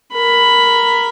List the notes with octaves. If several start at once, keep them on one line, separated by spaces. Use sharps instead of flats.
A#4 B5